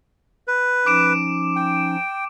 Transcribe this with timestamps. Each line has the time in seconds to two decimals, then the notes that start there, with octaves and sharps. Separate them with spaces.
0.48 B4
0.86 F3 C#4 D#4 D6 D7 E7
1.56 G5